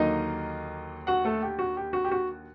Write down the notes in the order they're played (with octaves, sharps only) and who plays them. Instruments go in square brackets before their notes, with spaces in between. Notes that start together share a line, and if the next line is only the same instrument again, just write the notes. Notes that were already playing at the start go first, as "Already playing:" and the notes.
Already playing: [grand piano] D#2 D3 F#3 A#3 D#4 D#5
F#4 F#5
A3 A4
G4
F#4
G4
F#4
G4
F#4